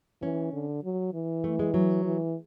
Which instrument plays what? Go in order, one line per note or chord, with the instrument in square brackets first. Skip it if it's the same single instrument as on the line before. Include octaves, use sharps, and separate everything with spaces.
[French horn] E3 [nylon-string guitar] C#4
[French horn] D3
F#3
E3
[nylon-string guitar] A3
G#3
F#3
[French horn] E3